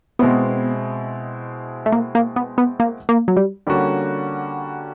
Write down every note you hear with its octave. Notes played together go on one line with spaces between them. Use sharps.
B2 G#3 B3 C4 E4
A3
A#3
A#3
B3
B3
A#3
A#3
F#3
G3
D3 G3 A#3 C#4 F#4